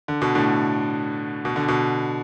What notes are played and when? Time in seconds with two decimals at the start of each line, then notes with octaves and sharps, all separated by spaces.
0.08 D3
0.22 B2
0.35 A2 D3
1.45 B2
1.56 D3
1.68 B2